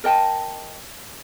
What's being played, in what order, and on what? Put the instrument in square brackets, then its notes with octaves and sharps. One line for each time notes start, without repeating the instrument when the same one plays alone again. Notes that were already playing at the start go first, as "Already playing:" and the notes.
[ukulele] A#4 D#5 G5 A5